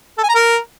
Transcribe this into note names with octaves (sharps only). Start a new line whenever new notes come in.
A4
G#5
A#5
A#4